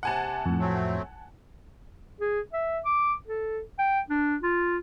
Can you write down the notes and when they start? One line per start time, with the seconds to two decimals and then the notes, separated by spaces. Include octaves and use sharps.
0.03 C3 F#5 G#5 A5
0.46 F2 A2
0.59 F#3 A3 C4
2.21 G#4
2.53 E5
2.85 D6
3.27 A4
3.79 G5
4.09 D4
4.42 F4